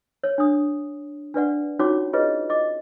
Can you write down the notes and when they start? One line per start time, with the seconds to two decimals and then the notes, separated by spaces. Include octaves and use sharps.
0.24 C#5
0.38 D4 D#6
1.34 D4 B4 D5 F#5
1.79 C#4 D#4 F4 F#4 C#5 D6
2.13 F4 G#4 B4 C#5 D#5
2.49 D#5 D6